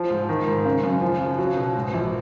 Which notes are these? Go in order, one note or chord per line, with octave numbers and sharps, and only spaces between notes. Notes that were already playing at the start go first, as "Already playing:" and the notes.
Already playing: F3
G#2
D#3
G#2
C#3
F#2
F3
C#3
F#3
B2
G#2
A#1